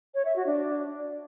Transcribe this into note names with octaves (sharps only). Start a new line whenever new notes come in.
C#5
E5
F#4
D4